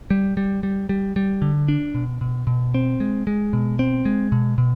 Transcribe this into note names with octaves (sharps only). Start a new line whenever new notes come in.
G3
G3
G3
G3
G3
D3
D4
B2
B2
B2
C4
G#3
G#3
B2
C4
G#3
B2
B2